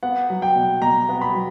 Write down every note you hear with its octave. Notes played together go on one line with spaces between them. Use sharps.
B3 F#5
F#3
G5
B2
B2 A#5
B3
B5
F#3